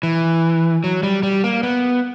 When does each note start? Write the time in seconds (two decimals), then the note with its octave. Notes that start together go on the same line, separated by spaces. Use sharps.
0.03 E3
0.84 F#3
1.03 G3
1.23 G3
1.44 A#3
1.63 B3